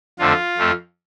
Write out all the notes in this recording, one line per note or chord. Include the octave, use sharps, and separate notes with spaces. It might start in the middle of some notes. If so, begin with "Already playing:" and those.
F2 D3 F3 A3 F4
F2 F3 A3